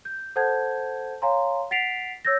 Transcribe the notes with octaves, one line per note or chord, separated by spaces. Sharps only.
G6
A4 C5 F#5 A5 G6 G#6
C#5 F5 G#5 A#5 C6
F#5 A6 B6 C7 D7 F7
C#5 E6 G6 A6 A#6